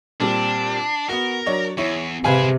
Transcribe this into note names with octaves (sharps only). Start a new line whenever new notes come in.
A#2 G3 C4 D4
B3 F#4 A#4
F#3 D4 C#5
E2 E4 C#5
C3 G#4 B4 C5 F5 G#5